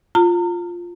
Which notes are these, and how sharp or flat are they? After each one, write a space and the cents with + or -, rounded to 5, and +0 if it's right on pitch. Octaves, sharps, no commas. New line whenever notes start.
F4 +0 A#5 -35